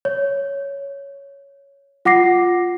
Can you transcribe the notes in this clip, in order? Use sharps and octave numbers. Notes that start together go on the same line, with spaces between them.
C#5
F4 F#5 D6 A#6 C7